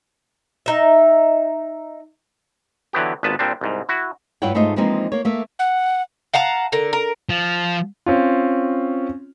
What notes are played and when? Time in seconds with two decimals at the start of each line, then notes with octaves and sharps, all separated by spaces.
0.66 D#4 E5
2.93 D3 E3 F#3 B3 G4
3.23 G#1 A#2 B3 B4 A5
3.39 A#2 G3 C4 D4
3.61 C2 G#2
3.89 E4 F#4
4.42 G2 E4 F4 C#5 F#5 G5
4.54 G#2 A3 F4 A4 C5 D#5
4.76 E3 F3 G#3 A#3 C4 D#4
5.12 A#3 C#5
5.25 A3 A#3 E5
5.59 F#5
6.34 F5 F#5 A5 A#5
6.72 D3 A#4
6.93 A#4
7.29 F3
8.06 C4 C#4 F4